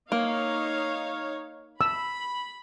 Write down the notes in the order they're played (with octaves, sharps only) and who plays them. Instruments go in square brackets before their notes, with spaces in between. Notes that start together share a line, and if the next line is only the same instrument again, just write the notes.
[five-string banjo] A#3 [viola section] D#4 C#5 F5
[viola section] B5 [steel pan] E6